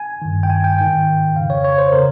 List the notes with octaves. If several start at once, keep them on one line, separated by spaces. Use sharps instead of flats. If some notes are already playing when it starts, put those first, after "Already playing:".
Already playing: G#5
G2 D#3
G5
G#5
G5
G#2 D#3 G5
F2 C#3 F5
C#5
C#5
C5
C#3 A#4